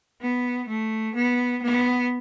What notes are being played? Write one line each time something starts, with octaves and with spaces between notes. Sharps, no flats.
B3
A3
B3
B3